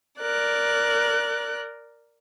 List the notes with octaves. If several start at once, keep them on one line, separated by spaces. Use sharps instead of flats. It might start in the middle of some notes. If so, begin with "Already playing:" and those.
A#4 D5 F#6